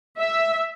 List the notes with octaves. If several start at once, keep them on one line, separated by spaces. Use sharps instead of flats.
E5